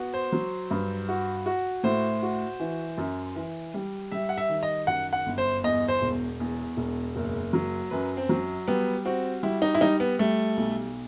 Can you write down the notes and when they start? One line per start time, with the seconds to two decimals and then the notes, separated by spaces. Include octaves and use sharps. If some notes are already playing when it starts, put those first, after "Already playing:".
Already playing: B3 F#4
0.14 C5
0.32 F#3
0.71 G2
1.08 F#4
1.46 F#4
1.83 A2 C5
2.23 F#4
2.60 E3
2.98 F#2
3.35 E3
3.74 G3
4.12 G3 E5
4.29 F#5
4.38 E5
4.49 D#3
4.63 D#5
4.87 F#2 F#5
5.13 F#5
5.26 G1
5.38 C5
5.64 E2 D#5
5.88 C5
6.02 E1
6.40 E2
6.77 E1
7.16 F#1
7.53 F#3
7.91 F#2 B4
8.17 C4
8.29 F#3
8.68 G3 B3
9.05 C4 F#4
9.43 G3 E4
9.62 D#4
9.75 E4
9.81 G3 D#4
10.00 B3
10.19 G3 A3
10.57 B1